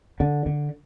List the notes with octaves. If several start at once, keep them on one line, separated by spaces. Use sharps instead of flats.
D3
D3